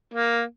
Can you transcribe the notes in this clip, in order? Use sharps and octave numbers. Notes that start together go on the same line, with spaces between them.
A#3